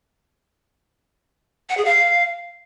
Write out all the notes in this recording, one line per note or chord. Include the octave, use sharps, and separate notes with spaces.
F#5
G#4
F5